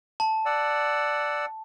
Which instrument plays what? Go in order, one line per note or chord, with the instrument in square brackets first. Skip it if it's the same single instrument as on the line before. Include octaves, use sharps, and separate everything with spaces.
[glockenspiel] A5
[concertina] D5 F#5 E6